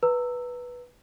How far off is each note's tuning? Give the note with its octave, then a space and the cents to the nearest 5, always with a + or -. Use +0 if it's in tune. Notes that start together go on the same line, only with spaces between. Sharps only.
B4 -10 A#5 -30 E6 +0